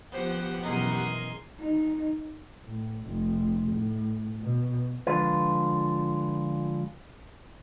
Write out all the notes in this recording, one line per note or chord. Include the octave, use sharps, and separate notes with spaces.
F3 B3 G4 C5 F#5
F#2 B2 E3 G#4 A#4 D#5 A#5 C6
D#4
A2
F1
A2
B2
D3 F3 G#3 F4 B4